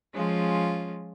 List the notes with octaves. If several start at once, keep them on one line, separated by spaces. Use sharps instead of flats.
F3 G#3 C#4 F4